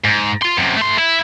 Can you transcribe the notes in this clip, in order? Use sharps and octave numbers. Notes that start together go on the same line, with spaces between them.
G#2
F4 C6
F#2 C3
A3 C6
E4